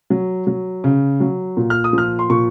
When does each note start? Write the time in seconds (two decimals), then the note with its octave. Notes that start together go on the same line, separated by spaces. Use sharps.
0.10 F#3
0.47 F#3
0.84 C#3
1.20 F#3
1.57 A#2
1.70 F6
1.84 D#6
1.93 F3 F6
2.19 C6
2.30 A#2 C#6